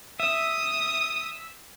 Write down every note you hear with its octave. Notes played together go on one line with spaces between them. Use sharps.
E5 D#6